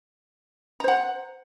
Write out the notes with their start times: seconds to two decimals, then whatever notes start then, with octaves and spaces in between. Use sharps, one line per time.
0.80 A#5
0.84 C5
0.88 F#5